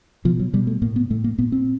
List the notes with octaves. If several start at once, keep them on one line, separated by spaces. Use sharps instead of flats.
B2 F3
F#3
B2 G3
A3
A2 A#3
B3
A2 A3
A#3
A#2 B3
C4